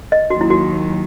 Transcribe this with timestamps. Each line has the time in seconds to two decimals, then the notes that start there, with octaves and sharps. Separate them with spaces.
0.12 D#5
0.30 D#2 D#3 F#3 F#4
0.41 E4
0.50 F#4